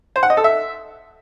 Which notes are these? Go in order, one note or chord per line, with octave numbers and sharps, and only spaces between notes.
C5
F#5
D#5
A4
E5